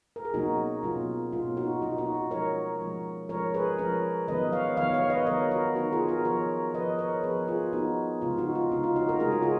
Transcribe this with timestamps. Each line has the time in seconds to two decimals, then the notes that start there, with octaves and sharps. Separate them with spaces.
0.16 A#4
0.25 G#4
0.34 B2 F#3 A#3 C#4 D#4 F#4
0.83 B2 F#3 A#3 C#4 F4
1.33 B2 F#3 A#3 C#4 F4
1.57 D#4 F#4
1.82 B2 F#3 A#3 C#4 D#4 F#4
1.98 D#4 F#4
2.14 D#4
2.31 F3 G#3 C#4 A#4 C#5
2.81 F3 G#3 C#4
3.29 F3 G#3 C#4 A#4 C#5
3.54 G#4 B4
3.79 F3 G#3 C#4 A#4 C#5
4.28 D#3 F#3 B3 B4 D#5
4.53 C#5 F5
4.77 D#3 F#3 B3 C#5 F5
4.94 C#5 F5
5.10 B4 D#5
5.27 D#3 F#3 B3 A#4 C#5
5.51 F#4 A#4
5.75 D#3 F#3 B3 D#4 F#4
5.92 F4 G#4
6.09 F#4 A#4
6.25 F3 B3 A#4 C#5
6.74 F3 B3 B4 D#5
6.99 A#4 C#5
7.23 F3 B3 G#4 B4
7.48 F4 G#4
7.73 F3 B3 D#4 F#4
8.22 C#3 G#3 C#4 F4
8.38 D#4 F#4
8.55 F4
8.72 C#3 G#3 C#4 D#4
8.84 F4
8.96 D#4 F#4
9.09 A#4
9.20 C#3 G#3 C#4 G#4
9.31 F#4
9.42 F4 G#4